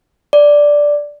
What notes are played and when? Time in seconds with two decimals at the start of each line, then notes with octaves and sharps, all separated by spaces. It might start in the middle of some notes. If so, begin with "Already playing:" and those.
0.33 D5